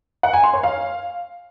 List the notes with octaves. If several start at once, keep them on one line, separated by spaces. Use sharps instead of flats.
F#5
G#5
C6
C#5
F5